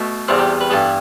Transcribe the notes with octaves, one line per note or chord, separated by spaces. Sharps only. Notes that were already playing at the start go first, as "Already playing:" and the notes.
Already playing: B2 A3
E2 C3 G3 B3 C4
G4
B4
G2 E3 B3 A4